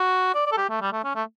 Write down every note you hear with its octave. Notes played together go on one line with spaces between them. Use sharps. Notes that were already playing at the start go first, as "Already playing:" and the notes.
Already playing: F#4
D5
D5
A4
G4
A3
G3
A3
C#4
A3